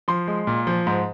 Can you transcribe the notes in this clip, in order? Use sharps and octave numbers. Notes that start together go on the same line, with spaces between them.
F3 C6
G#3
A#2
F3
G#2